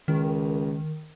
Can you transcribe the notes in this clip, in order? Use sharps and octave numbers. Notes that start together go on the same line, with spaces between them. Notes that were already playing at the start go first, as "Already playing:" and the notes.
C#2 D#3